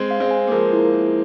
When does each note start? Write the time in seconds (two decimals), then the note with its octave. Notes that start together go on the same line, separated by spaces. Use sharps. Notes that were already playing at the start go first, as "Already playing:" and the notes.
Already playing: G#3 C4
0.11 F5
0.20 G#3 C4
0.31 G#5
0.47 A#3
0.51 F3 G#3 A#4
0.73 E4
0.94 E4